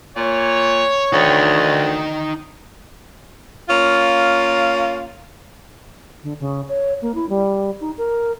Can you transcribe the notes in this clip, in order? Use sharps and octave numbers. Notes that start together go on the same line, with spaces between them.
A#2 C#5
D2 D#4 G5
A#3 C#4 F4
D3
C#3
C#5
A#3
E4
G3
D#4
A#4